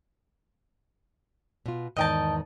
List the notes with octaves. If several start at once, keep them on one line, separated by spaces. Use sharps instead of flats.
B2 F4
E2 G#2 D#3 D#5 G5 A5